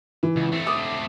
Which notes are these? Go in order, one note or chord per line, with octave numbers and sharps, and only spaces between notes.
E3
C#2
A3 C4
D6 D#6